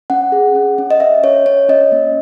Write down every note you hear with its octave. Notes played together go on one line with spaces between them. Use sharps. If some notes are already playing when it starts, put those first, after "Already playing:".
C#4 F#5
G#4
C#4
C#4
D#5
C#4 E5
C#4 C#5
C#4 C#5
C#4 D#5
A#3